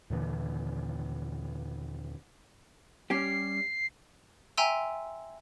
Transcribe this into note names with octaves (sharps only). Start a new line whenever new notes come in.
D#2 A#2 D3 E3
G3 C#4 G4 C7
E5 G5 G#5 A#5 C6 E6